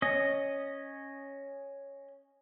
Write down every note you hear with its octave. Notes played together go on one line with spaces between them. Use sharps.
C#4 D#5